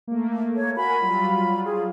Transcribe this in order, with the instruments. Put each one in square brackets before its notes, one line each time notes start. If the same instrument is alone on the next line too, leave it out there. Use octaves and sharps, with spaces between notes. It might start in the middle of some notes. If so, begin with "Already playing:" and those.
[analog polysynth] A3 A#3
[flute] C#5
[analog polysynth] F#4 A#4 G#5 [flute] B5
[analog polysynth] F#3 G3 F4
[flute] G#4